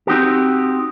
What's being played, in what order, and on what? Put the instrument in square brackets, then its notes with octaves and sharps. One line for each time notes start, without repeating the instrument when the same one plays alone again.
[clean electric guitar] C4 D#4 F#4 G4